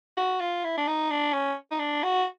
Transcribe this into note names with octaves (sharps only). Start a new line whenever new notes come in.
F#4
F4
E4
D4
D#4
D4
C#4
D#4
D4
F#4